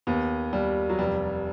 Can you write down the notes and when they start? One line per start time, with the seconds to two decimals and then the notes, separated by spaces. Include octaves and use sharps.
0.07 D#2 B3
0.53 D#2 G3
0.89 F#3
0.99 F1 G3